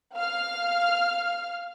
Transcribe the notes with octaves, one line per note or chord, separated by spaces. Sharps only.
F5 F6